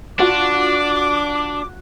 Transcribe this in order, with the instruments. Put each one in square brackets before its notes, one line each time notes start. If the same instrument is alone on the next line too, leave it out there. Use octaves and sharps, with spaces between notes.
[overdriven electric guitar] D4 [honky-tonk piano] F4 F#4 [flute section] D6